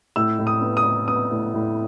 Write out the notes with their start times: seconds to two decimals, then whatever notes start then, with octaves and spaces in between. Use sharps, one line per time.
0.16 A2 E6
0.39 A2
0.47 D#6
0.61 B3
0.77 D#6
0.85 A2
1.08 B3 D#6
1.31 A2
1.54 A2